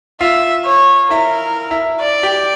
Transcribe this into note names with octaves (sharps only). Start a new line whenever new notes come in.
F4 E5 F5
C#5
E4 A#4 E5
E4 E5
D5
G4 G5